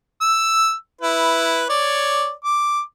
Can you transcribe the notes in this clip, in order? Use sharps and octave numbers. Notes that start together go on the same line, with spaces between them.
E6
E4 B4
C#5 D5
D6